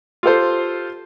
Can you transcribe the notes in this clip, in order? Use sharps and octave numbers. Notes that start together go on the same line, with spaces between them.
F4 G4 A4 C5